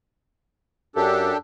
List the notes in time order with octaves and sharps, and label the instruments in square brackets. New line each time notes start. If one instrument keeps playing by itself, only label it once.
[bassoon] F#2 [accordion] D4 G4 A4